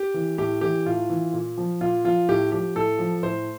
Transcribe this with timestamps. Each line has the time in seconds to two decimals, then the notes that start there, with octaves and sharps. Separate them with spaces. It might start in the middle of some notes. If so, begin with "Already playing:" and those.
Already playing: G4
0.14 E3
0.38 A2 G4
0.61 E3 G4
0.86 A2 F4
1.10 E3
1.33 A#2
1.58 F3
1.81 A#2 F4
2.04 F3 F4
2.29 A2 G4
2.51 F3 G4
2.75 A2 A4
2.99 F3
3.23 A2 C5